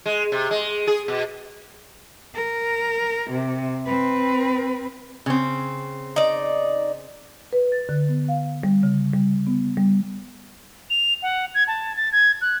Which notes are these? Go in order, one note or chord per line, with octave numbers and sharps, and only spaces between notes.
G#3
C3
G#3
G#4
B2
A#4
C3
C4 B4
C#3 C4
D#4 D5
B4
A6
D3
B3
F5
G3
C#3
G3
B3
G3
F7
F#5
G#6
A5
A6
G#6
F#6